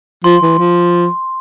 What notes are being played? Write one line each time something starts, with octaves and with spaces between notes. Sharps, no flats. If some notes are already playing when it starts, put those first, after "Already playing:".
F3 C6
E3
F3